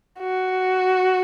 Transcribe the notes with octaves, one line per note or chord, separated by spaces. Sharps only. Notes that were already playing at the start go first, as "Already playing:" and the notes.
F#4